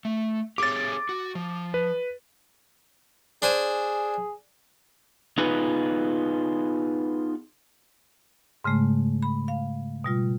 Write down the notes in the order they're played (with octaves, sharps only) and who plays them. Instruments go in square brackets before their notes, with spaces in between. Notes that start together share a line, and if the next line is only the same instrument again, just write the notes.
[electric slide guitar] A3
[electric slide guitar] G4 G#4 C#5 [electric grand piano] D6 A6
[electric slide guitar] F#4
F3
[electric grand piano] B4
[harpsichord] D4 C5 G#5 [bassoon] G#4
[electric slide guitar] B3 D#4 F4 G#4 B4
[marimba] G#2 C#3 G#3 A3
B5
F5
B2 G3 F4